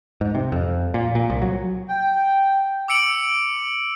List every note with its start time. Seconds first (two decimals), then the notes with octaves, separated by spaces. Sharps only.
0.21 G#2
0.35 C3
0.52 F2
0.94 A#2
1.15 A#2
1.30 C2
1.42 F#3
1.89 G5
2.88 D6 E6 C#7 D7 F#7